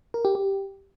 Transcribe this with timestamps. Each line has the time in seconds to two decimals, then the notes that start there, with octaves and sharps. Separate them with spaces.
0.14 A#4
0.25 G4
0.35 G4